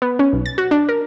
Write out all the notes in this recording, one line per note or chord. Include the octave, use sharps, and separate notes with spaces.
B3
C#4
B1
A6
F#4
D4
A#4